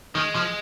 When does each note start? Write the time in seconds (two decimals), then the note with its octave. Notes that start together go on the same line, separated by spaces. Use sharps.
0.15 D#3 G#3
0.35 F3